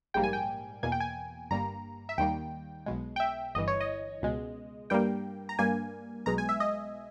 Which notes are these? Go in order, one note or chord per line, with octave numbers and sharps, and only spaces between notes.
A#1 G#2 G3 A#3 G5
G#5
G5
E2 B2 A#3 G#5
G5
G#5
G1 G2 G3 A#3 A#5
E5
D#2 D#3 G3 A#3 G5
B1 B2 G#3
G5
E5
G1 G2 E3 D#5
C#5
D#5
C#2 B2 G#3
G2 G3 A#3 G5
A#5
G2 G3 A#3 G#5
B1 B2 G#3 A#5
G#5
E5
D#5